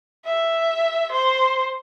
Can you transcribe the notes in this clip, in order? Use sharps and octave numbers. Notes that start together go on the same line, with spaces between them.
E5
C5